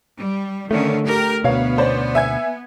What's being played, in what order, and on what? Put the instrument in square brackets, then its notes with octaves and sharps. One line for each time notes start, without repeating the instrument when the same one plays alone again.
[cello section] G3
[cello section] D3 D#3 C#4 [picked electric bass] A3
[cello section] G4 A#4
[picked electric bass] D2 B2 [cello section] B3 [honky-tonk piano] C#5 F5
[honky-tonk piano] C#4 C5 D5
E5 G#5 G#6